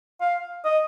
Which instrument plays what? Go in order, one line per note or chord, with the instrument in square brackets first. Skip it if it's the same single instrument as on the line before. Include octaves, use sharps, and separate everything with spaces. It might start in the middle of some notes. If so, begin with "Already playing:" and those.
[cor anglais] F5
D#5